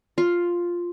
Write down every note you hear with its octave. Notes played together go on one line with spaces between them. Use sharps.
F4